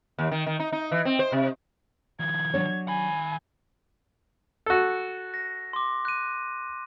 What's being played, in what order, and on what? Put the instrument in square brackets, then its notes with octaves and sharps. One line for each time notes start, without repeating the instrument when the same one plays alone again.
[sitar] D#2
D#3
D#3
D#4
D#4
E3
C4
C5
C3
[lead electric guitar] D#3 F3 [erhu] G#6
[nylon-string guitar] F#3 D4 C#5
[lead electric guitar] D#3 B5 [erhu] G#5
[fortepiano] F#4 A4
[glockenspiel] A#6
C6 D6
F#6 D#7